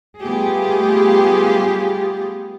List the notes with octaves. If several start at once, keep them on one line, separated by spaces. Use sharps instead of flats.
G3 A3 B3 F4 G4 G#4